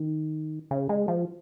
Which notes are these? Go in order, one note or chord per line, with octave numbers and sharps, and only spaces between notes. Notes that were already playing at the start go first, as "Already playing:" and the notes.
Already playing: D#3
C#3
G#3
F3